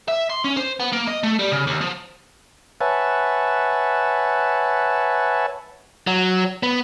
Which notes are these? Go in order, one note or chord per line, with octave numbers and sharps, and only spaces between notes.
E5
C6
C#4
C5
B3
A#3
D#5
A3
G3
C#3
D#2
F3
B4 C#5 E5 F#5 G#5 A5
F#3
B3